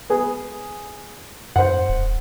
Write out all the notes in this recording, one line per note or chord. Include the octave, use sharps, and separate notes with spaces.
B3 G#4
F#2 C5 F#5
D#1